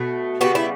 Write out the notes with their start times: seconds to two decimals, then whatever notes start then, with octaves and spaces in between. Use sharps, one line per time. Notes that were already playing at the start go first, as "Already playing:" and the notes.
Already playing: B2 A3
0.41 C#3 G3 B3 F#4
0.55 E4